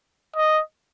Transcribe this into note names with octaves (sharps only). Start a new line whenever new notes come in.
D#5